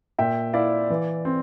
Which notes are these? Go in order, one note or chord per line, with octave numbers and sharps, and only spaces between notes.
A#2 E5 G5
E4 D5 F5
E3
C4